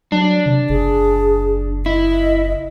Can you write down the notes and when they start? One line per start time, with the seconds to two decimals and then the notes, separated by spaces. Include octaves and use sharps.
0.12 F#3 D4
0.46 C3
0.70 F#1 G#4
1.86 E4 D#5